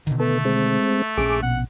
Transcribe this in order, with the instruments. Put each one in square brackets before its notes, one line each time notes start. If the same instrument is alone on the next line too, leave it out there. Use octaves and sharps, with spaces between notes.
[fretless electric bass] B2 D3 D#3
[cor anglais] A3 [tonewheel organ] B3 A4
[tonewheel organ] G#3 C4
[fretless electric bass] A#1 C4 C#4 [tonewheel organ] G#4 D6
[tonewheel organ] B2 [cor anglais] F#5